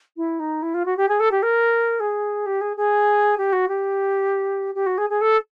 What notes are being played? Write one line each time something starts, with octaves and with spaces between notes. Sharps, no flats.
E4
D#4
E4
F4
F#4
G4
G#4
A4
G4
A#4
G#4
G4
G#4
G#4
G4
F#4
G4
G4
F#4
G#4
G#4
A4